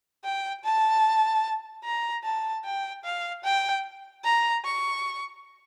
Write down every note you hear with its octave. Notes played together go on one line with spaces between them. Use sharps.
G5
A5
A#5
A5
G5
F5
G5
A#5
C#6